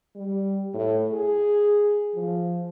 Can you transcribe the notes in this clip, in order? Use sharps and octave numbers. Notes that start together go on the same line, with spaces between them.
G3
A2
G#4
F3